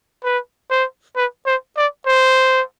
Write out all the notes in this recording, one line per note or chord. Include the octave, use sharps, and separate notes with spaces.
B4
C5
B4
C5
D5
C5